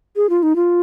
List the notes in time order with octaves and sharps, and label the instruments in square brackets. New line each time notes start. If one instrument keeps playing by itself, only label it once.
[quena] G#4
F4
D#4
F4